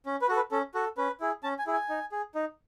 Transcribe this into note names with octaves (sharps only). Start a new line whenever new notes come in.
C#4
B4
F#4 A4
B4
C#4 A4
F#4 A4
C#4 B4
E4 G#4
C#4 A5
G#5
E4 G#4
G#5
D#4
G#4
D#4